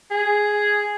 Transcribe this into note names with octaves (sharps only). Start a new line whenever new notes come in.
G#4